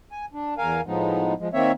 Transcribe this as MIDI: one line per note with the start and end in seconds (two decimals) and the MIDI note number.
0.12 0.25 80
0.33 0.54 62
0.58 0.81 40
0.58 0.81 70
0.58 0.81 77
0.58 0.81 80
0.86 1.34 45
0.86 1.34 53
0.86 1.34 56
0.86 1.34 59
0.86 1.34 63
1.39 1.48 53
1.39 1.48 56
1.53 1.72 51
1.53 1.72 58
1.53 1.72 60
1.53 1.72 73
1.53 1.72 76